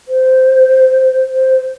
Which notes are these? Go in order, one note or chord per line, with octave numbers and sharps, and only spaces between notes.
C5
C5